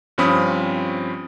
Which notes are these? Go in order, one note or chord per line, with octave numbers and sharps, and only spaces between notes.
G2 F3 C4 C#4 B5 D#6